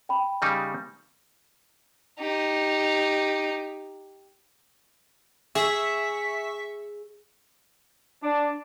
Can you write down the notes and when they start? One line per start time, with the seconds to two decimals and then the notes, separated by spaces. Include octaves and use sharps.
0.09 G5 B5
0.42 C#3 G3 D#4
2.20 D#4 G4
5.55 G#4 E5 C#6 B6
8.23 D4